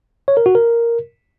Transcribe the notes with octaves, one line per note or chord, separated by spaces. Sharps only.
C#5
A#4
F#4
A#4